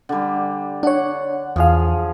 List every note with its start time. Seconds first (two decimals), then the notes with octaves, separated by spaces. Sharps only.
0.09 D3 G3
0.83 D4 C#5 F#5
1.56 E2 F3 G#4 F5